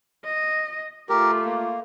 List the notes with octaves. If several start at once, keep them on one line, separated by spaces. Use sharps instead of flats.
D#5
A3 F4 G4 A#4
A#3